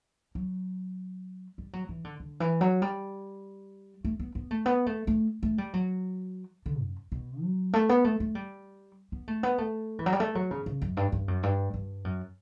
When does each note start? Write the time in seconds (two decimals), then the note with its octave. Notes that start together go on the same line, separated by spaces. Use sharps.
0.35 F#3
1.58 G3
1.73 F#3
1.89 E3
2.04 D3
2.20 D3
2.40 E3
2.61 F#3
2.82 G3
4.05 A3
4.19 B3
4.35 B3
4.51 A3
4.66 B3
4.86 A3
5.07 A3
5.43 A3
5.58 G3
5.74 F#3
6.66 D3
6.81 F#2
7.12 B2
7.43 F#3
7.73 A3
7.89 B3
8.04 A3
8.20 A3
8.35 G3
9.12 B3
9.28 A3
9.43 B3
9.58 A3
9.99 E3
10.06 F#3
10.13 G3
10.20 A3
10.35 F#3
10.51 C#3
10.66 C#3
10.82 F#2
10.97 G2
11.12 G2
11.28 F#2
11.43 G2
11.74 G2
12.05 F#2